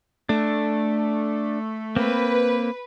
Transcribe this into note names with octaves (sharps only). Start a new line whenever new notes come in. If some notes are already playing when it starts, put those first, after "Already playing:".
A3 D4
A#3 C4 B4